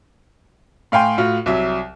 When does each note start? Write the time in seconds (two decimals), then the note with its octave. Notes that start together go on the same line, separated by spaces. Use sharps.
0.92 A2 F5 G5 G#5 C6
1.18 A2 F4 F#4
1.46 C2 F#3 E5